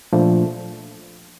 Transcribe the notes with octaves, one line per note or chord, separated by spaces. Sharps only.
A#2 F3 A3 D4